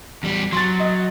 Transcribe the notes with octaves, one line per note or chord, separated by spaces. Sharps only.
E2 G3
F#3 C6 A6
D#5